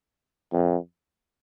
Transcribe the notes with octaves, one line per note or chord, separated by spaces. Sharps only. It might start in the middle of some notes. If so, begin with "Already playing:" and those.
F2